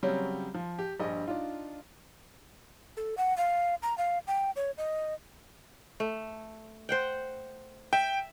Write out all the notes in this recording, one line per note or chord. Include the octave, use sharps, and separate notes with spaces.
C#3 F#3 G3 C4 C#4
F3
G4
A#1 G2 G3 D#5
D4 D#4 F4
A4
F#5
F5
A#5
F5
G5
C#5
D#5
A3
C5 F#5 G5
E5 G5